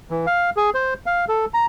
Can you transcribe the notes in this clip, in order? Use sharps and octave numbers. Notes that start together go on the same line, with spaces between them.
E3
F5
G#4
C5
F5
A4
A#5